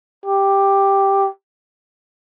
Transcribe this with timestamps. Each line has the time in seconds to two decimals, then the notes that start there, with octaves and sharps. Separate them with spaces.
0.25 G4